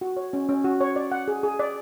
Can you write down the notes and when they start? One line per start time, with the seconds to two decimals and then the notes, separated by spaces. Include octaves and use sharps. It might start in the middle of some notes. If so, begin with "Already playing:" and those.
0.01 F#4
0.17 C#5
0.33 C#4
0.49 C#4
0.64 F#4
0.81 C#5
0.96 D5
1.12 F#5
1.28 G#4
1.43 G#4
1.59 D5